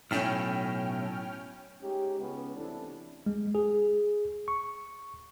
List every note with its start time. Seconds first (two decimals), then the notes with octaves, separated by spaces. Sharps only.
0.11 B1 A2 C#4 G5 F6
1.82 G#3 C#4 D#4 G4
2.20 C#2 B3 C#4
2.56 C3 E3 A3 D4 E4 A4
3.26 G#3
3.55 G#4
4.48 C#6